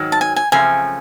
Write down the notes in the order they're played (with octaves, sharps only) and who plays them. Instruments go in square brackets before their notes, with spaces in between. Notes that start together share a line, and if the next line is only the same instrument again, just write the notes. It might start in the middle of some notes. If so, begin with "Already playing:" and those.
Already playing: [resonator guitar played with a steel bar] G#2 D#3 F#3
[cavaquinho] A5
G#5
G#5
[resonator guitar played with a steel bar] F#2 C#3 F3 A3 C4 [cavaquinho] G#5